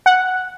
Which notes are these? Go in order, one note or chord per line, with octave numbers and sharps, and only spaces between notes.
F#5